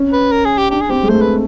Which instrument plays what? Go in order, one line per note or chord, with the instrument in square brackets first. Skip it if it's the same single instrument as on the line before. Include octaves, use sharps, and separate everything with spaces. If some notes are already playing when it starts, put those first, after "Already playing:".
Already playing: [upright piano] C#4
[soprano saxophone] B4
A#4
G#4
G4
[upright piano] D4 [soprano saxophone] G4
[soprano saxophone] G#4
[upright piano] C4 [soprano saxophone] G4
[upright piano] G#3
[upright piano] A3 [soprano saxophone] C5
[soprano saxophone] B4